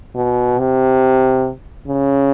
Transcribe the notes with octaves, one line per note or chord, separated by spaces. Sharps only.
B2
C3
C#3